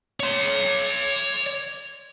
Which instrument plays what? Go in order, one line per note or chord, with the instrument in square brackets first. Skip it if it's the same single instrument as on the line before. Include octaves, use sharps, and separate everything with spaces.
[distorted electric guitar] C#5 C6